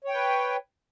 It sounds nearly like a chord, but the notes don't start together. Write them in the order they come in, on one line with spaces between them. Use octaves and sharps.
C#5 G5 B4